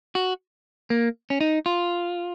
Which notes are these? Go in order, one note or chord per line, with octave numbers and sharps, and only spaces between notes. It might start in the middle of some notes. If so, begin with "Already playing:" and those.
F#4
A#3
C#4
D#4
F4